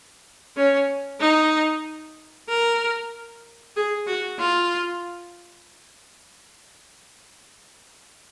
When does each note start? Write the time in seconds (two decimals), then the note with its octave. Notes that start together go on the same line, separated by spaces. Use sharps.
0.57 C#4
1.21 D#4
2.49 A#4
3.76 G#4
4.07 F#4
4.39 F4